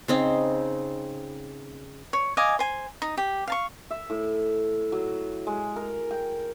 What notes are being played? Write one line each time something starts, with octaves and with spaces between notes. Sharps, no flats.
C#3 C4 D#4
C#5
D#5 F5 G#5 D6
C5 G#5
D#4
G4
F5 A5 C#6
E5
A2
F#3
G#3
A#4
G5